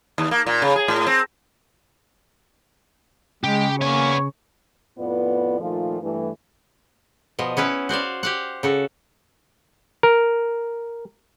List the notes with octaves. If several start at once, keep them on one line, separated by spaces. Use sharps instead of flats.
D#2
A#3
A#2
C#3
G#4
A2
C4
C#3 G#3 G4
A#3 B3 C#5 G#5
F2 A2 B3 F4 B4 D5
A#2 D#3 F3 A3 F4
G2 E3 A3
B2 F3 D#5
B3 C#4 E4 B4
F#4 C5 D5 F5
G4 F5 F#5
C#3 F#4 A4
A#4